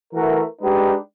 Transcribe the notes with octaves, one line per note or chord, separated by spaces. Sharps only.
E3 A3 F#4 A#4
G#3 D4 D#4 G4 B4